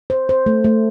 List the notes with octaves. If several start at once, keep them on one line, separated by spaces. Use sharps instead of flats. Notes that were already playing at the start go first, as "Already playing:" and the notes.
C5
C5
A3
A3